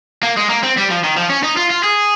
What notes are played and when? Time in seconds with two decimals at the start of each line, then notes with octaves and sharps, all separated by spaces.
0.23 A#3
0.37 G#3
0.49 A#3
0.63 C4
0.77 G3
0.90 F3
1.04 D#3
1.17 F3
1.30 C#4
1.43 D#4
1.57 F4
1.70 F4
1.83 G#4